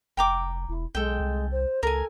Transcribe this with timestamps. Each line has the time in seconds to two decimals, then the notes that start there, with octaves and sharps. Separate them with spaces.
0.17 F1 G5 A#5 D6
0.69 E1 E4
0.95 B1 G#3 A4 G5
1.20 C2
1.51 C5
1.83 C#2 A4 A#4 G#5